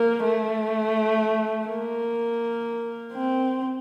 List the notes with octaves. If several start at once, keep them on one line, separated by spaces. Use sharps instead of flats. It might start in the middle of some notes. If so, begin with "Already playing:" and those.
Already playing: A#3
A3
A#3
C4